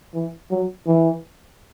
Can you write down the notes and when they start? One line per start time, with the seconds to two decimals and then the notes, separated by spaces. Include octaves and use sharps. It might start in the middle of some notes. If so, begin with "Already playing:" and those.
0.14 E3
0.51 F#3
0.87 E3